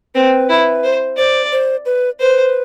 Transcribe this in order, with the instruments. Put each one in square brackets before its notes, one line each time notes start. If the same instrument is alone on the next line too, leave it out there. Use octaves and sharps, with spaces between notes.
[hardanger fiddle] C4 [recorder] B4
[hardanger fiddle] E4
C5
[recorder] C5 [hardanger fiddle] D5
[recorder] C5
B4
[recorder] B4 [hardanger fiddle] C5